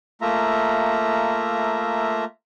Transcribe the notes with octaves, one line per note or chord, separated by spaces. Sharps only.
A3 A#3 F4 E5 A#5